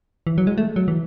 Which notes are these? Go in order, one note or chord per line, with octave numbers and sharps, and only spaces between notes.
E3
F#3
G#3
A3
F#3
E3